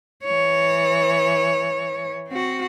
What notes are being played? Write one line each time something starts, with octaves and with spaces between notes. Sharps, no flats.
E3 C#5
C4 F#4